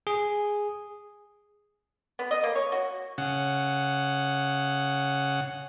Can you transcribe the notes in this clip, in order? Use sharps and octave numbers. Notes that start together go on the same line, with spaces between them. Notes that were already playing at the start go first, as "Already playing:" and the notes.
G#4
B3
D#5
A#3
C#5
F#4
C#3 F#5